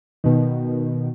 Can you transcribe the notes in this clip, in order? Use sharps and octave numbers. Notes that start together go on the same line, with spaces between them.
B2 D#3